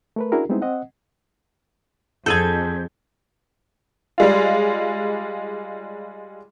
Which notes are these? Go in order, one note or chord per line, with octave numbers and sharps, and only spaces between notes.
A3 A#4 B4
C#4 D4 E4 F#4 G#4 A#4
G3 G#3 B3 C4 D#4 E4
C4 D#5 F#5
F2 G#4 A4 G6 G#6
G3 G#3 F4